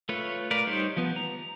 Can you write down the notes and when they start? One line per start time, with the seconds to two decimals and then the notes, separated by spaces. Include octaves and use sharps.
0.09 A3 F4 B4 C#5
0.51 A#4 B4 D5 F5
0.67 G3 D#4 G4 C5 C#5
0.97 F3 B3
1.16 A#5